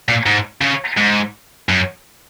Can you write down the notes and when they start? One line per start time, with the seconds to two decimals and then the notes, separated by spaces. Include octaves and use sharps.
0.08 A#2
0.26 G#2
0.61 C#3
0.97 G#2
1.69 F#2